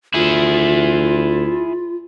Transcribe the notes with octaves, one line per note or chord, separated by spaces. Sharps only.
D2 E4 F4 G#4